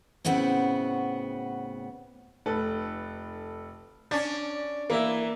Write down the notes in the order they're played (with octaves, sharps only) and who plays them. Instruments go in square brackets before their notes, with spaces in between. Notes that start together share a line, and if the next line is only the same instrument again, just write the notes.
[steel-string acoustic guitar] A2 C#3 B3 C4 F#4
[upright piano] F1 A4 B4
[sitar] C#4 D4 [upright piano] A6
[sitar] E3 [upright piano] A#3 E5